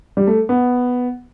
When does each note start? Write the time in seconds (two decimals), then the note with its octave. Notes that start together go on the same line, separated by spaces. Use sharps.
0.17 G3
0.27 A3
0.49 B3